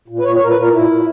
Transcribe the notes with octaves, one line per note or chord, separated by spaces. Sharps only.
A#2
B4
A#2 C#5
C#5
A#2 A#4
B4
A#2 A#4
A#2 E4
A#2